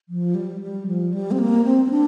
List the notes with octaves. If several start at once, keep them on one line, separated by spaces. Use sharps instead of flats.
F3
G3
G3
F3
G3
C4
A#3
C4
C4
D4